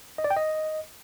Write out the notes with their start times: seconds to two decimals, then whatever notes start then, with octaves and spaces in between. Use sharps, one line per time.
0.18 D#5
0.24 D5
0.30 G5
0.37 D#5